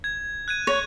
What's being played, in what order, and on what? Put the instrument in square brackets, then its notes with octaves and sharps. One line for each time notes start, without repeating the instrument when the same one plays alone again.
[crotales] G#6
F#6 G#6 D#7
[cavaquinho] C#5